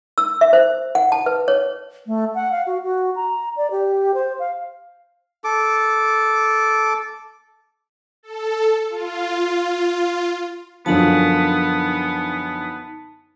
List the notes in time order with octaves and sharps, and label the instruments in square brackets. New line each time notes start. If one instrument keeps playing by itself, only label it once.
[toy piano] E6
E5
C5
F#5
A5
B4
C#5
[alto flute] A3
F#5
F5
F#4
F#4
A#5
D5
G4
C5
F5
[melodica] A4 D6
[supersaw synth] A4
F4
[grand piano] F#2 D3 F3 [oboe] B3 [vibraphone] D#4 A5